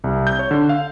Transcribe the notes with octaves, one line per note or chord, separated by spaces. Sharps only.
C2
G6
C#5
D3
F5